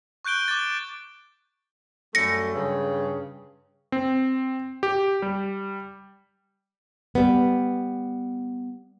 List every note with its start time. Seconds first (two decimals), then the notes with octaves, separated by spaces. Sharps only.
0.25 C#6 F#6 G6 D7 G7
0.48 D6 A6
2.15 F#2 G3 A3 A#6 C#7
2.54 G2 C#3
3.92 C4
4.83 G4
5.22 G3
7.15 G3 B3